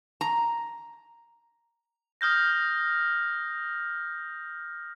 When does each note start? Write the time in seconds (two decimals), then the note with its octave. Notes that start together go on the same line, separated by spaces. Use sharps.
0.21 A#5
2.21 D#6 F6 G6 A#6